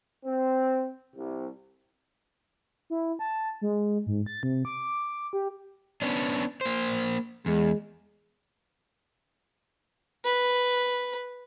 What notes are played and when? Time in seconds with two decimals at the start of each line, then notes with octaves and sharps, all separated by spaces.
0.25 C4
1.16 C2
2.90 E4
3.19 A5
3.61 G#3
4.07 G#2
4.26 A6
4.43 C3
4.65 D6
5.33 G4
6.02 B3 C#4 D4
6.61 A#3 C5
7.46 E2 G#3
10.24 B4